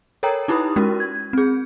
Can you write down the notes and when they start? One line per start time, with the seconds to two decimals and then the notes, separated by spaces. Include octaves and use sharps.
0.23 A4 A#4 C#5 G5 A#5
0.48 D#4 E4 G4 B4 B5 D#6
0.76 G#3 C#4 F#4 A#4
1.00 G#6
1.33 C4 G#4